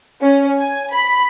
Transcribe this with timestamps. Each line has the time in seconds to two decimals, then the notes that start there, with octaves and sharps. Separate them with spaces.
0.22 C#4
0.60 G#5
0.93 B5